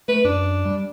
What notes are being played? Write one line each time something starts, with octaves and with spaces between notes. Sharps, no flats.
A3 B4
F#2 D4
G3